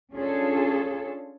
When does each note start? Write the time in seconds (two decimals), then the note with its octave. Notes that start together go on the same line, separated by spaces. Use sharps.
0.13 C#4 D4 F4 G#4 A4